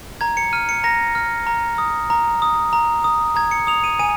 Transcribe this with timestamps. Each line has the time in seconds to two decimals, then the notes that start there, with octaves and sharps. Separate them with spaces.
0.21 A#5 G#6
0.37 C#7
0.53 F6 D#7
0.69 C#7
0.84 A#5 A#6
1.15 F6
1.47 A#5
1.78 D#6
2.10 A#5
2.42 D#6
2.73 A#5
3.04 D#6
3.36 A#5 G#6
3.51 C#7
3.67 D#6 F7
3.84 D#7
3.99 G#5 D#7